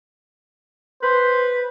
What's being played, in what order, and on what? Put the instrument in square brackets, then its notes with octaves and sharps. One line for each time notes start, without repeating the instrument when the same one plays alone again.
[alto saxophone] B4 [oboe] C5